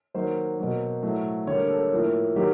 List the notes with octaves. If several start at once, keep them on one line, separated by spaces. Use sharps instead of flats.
D#3 F#3 A#3 C5
B2 F#3 A#3
A2 F#3 A3
D3 G3 A#3 C#5
A4
A2 F3 A#3
D#3 F#3 A#3 G4